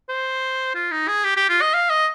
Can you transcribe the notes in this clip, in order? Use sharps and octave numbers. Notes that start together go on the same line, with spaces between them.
C5
F4
D#4
G#4
G4
G4
F4
D#5
F5
D#5